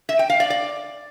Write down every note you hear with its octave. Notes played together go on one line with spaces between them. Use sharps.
E5
G5
F5
D5
D5